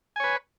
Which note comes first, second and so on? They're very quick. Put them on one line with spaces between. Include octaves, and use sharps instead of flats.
G#5 C#5 B4